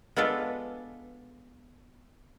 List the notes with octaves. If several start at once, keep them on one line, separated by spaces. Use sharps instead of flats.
G#3 B3 D4 F4 A4 B4